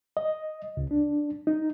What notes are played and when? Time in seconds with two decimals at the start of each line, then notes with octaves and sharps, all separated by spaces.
0.17 D#5
0.77 C#2
0.91 D4
1.47 D#4